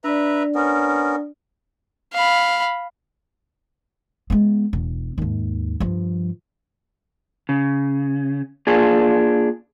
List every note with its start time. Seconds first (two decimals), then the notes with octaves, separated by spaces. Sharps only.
0.04 D4 B4 D5 E5 A#5
0.55 B3 C#4 A#4
2.14 F5 B5
4.30 G#3 B3
4.73 E1
5.18 D#2 G#2
5.80 G2 F3
7.49 C#3
8.67 A#3 D4 F4 G#4 F5